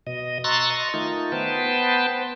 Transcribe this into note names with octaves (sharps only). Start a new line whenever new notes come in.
B2 D#5
A#5 C6 C#6 E6 F#6 A6
D#5 C#6
D#3 A3 D#4 F4
B3 B4 C5 G5 A5